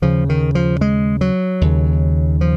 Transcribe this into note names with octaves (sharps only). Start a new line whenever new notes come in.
D#2 C#3 F3
D#3
F3
G#3
F#3
D#2 C#3
F3